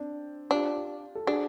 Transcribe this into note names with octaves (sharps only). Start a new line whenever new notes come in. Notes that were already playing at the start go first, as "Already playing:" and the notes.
Already playing: C4 D4
D4 F4 G4
A4
D4 F#4 G#4